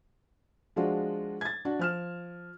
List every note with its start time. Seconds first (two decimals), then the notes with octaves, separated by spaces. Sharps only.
0.76 F3 G#3 D4 F4 F#4
1.41 G#6 A6
1.65 D4 F#4
1.79 F3 F6 E7